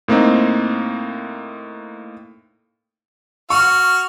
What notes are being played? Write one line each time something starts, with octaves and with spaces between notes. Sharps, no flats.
A2 A#3 C4 D#4
F#4 C#6 F6